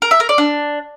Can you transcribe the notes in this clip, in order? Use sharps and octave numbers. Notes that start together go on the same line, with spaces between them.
A#4
E5
A#4
D5
D4